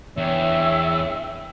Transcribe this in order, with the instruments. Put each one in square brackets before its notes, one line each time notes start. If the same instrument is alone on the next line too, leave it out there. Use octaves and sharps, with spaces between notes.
[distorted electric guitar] E2 [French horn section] D4 C#5 [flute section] E5 G5 E6